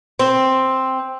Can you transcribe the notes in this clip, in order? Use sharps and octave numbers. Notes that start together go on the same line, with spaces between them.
C4